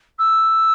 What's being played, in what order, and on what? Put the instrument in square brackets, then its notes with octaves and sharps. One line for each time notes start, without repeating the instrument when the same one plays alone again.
[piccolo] E6